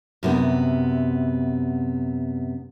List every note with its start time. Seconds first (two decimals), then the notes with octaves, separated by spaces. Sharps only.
0.23 F#2 C3 B3